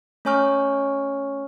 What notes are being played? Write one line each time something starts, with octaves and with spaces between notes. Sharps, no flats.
A3 C#4 C#5 G#5 C#6 F6